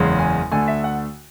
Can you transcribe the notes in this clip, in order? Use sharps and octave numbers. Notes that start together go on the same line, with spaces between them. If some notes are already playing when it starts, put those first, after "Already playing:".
Already playing: F#1 E2 C#3 G#3
G#5
D2 D3 A3 G#5
E5
F#5